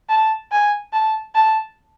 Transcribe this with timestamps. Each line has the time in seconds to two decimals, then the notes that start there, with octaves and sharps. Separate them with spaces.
0.09 A5
0.52 G#5
0.93 A5
1.35 A5